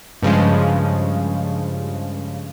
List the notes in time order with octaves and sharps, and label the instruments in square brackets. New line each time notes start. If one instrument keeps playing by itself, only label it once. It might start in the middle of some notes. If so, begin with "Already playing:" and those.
[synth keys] G2 C#3 F3 G#3